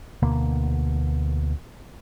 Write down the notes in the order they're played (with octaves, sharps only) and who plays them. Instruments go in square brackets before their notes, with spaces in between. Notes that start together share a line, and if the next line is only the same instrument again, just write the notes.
[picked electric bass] D2 B2 D3 A#3